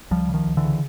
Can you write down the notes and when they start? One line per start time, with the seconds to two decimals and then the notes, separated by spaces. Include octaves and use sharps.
0.11 C#2 F3 G3
0.28 C#3
0.34 D#3 F3
0.46 C#2
0.57 D3 E3
0.63 C#3